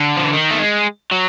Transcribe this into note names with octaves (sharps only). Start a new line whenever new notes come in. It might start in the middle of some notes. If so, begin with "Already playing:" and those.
Already playing: D3
F3
E3
D#3
A3
G#3
F#3